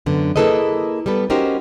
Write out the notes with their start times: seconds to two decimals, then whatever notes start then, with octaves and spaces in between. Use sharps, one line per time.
0.06 F#2 D3 B3
0.36 A#3 E4 G#4 A4 B4 D#5
1.06 G3 B3 A4 B4
1.30 C#4 D#4 F#4 G4 A#4 C5